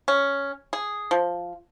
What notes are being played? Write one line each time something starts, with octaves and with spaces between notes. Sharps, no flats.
C#4
G#4
F3